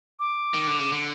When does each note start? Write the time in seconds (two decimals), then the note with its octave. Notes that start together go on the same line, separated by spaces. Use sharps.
0.20 D6
0.54 D#3
0.67 D3
0.79 C#3
0.92 D3